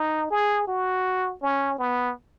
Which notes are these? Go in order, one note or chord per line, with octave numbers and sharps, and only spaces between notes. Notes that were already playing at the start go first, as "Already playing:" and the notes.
Already playing: D#4
G#4
F#4
C#4
B3